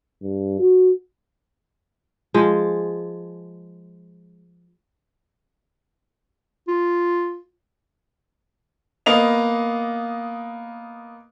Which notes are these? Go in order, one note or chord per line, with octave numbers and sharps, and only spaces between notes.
G2
F#4
F3 G#3
F4
A#3 B3 D#5 F7